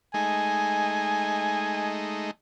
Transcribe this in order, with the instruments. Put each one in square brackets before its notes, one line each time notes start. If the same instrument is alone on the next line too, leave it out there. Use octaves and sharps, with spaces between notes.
[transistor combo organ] G#3 A3 D#4 [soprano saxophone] G#5